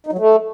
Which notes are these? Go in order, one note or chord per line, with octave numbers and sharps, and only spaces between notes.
D#4
F#3
A3